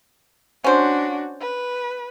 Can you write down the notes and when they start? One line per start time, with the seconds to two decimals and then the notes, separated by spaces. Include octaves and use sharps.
0.64 C#4 D4 F#4 C5
1.41 B4